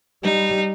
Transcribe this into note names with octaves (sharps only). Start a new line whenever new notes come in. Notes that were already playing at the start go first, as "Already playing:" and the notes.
G3 D#4